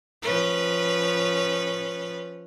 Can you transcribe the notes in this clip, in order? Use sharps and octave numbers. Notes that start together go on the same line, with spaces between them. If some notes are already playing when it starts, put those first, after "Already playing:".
F3 C#4 B4